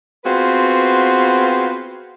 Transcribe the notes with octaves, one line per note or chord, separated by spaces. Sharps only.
B3 C4 F4 F#4 G#4 B4